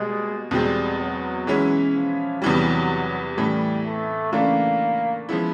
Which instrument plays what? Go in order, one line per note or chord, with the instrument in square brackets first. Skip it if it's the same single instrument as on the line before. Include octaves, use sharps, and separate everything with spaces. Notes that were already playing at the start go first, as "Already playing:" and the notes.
Already playing: [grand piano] B2 G3 A#3 [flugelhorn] G#3
[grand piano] E2 B2 G#3 C4 [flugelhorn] G3
[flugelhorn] F#3
[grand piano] E3 G#3 C#4 E4
[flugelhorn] F3
[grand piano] E2 C3 E3 G3 [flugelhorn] F#3
[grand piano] A2 E3 A3 [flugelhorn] G3
[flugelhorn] A3
[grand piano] C#3 E3 A3 D4 [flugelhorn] A#3
[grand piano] F3 G#3 B3 E4